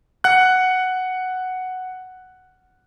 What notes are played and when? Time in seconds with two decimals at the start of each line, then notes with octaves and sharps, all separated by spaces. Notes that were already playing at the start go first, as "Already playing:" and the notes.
0.24 F#5 F#6